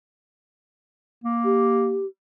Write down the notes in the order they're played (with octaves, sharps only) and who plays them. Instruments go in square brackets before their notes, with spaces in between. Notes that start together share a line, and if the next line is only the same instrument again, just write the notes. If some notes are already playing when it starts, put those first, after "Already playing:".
[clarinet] A#3
[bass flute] G4